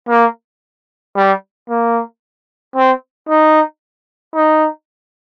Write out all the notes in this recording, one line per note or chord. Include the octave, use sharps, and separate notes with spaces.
A#3
G3
A#3
C4
D#4
D#4